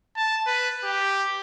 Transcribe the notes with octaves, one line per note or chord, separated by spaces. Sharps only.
A5
B4
G4